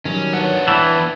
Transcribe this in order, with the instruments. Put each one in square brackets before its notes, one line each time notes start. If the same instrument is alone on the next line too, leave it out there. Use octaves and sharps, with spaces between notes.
[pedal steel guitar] D#3 F#3 G3 [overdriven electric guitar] C#4
[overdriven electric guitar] B3 D4 [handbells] C#5 F#5 E6
[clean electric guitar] E3 [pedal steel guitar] B4 G5 A5 [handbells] G#6